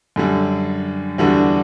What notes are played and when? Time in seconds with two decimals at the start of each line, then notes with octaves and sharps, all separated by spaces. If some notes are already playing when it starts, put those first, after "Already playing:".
0.16 F#2 D3 G3
1.18 E2 D3 G3 D4 F#4